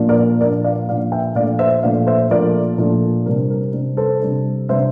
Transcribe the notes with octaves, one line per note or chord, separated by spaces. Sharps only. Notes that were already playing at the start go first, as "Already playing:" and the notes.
Already playing: A#2 F3 A#3 D4
A#4 D5
A#2 F3 A#3 D4 A#4 D5
D5 F5
A#2 F3 A#3 D4 D5 F5
E5 G5
A#2 F3 A3 D4 D5 F5
C5 E5
A#2 F3 A3 D4 D5 F5
C5 E5
A#2 F3 A3 D4 A#4 D5
A#2 F3 A3 D4
C3 G3 D4 A#4
A#4
C3 G3 D4
A4 C5
C3 G3 D4
C3 G3 D4 C5 E5